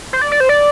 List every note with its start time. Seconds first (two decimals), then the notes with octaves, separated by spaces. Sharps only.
0.13 C5
0.22 D5
0.32 D5
0.40 C5
0.49 D5